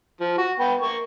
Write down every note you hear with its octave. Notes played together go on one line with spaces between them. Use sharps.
F3
F#4
B3 G5
A#3 C#6